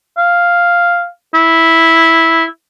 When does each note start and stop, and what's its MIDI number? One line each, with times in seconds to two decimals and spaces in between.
0.17 1.07 77
1.34 2.44 64